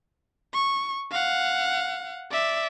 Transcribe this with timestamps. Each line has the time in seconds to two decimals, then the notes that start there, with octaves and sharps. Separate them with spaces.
0.54 C#6
1.11 F5 F#5
2.31 D5 E5